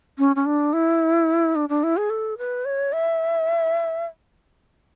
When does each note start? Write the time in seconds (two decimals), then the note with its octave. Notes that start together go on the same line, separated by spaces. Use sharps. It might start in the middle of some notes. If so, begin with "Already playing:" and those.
0.18 C#4
0.36 C#4
0.46 D4
0.73 E4
1.55 D4
1.69 D4
1.83 E4
1.97 G#4
2.10 A4
2.38 B4
2.65 C#5
2.93 E5